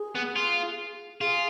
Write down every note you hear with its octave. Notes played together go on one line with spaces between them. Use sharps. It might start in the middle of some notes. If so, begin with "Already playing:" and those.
Already playing: G#4
B3
F4
F4 G#4